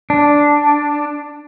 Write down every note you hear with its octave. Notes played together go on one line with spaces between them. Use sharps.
D4